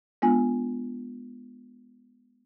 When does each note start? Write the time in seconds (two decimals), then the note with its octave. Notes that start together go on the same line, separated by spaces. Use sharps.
0.22 G#3 B3 D4 F4 G#5